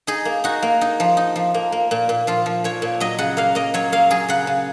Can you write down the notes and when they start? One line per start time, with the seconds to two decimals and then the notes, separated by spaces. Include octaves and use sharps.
0.07 D#4 G#4
0.25 A#3
0.44 D#4 F#4
0.62 A#3
0.81 D#4
1.00 F3
1.17 D#4
1.36 F3
1.54 A#3
1.72 A#3
1.91 A#2
2.09 A#2
2.27 F3 F4
2.46 F3
2.64 A#2 C#5
2.82 A#2
3.00 F#3 D#5
3.18 C#3 F#5
3.37 A#3 F5
3.55 A#3 D#5
3.74 F#3 C#5
3.92 A#3 F5
4.10 F#3 G#4
4.28 C#3 F#5
4.47 C#3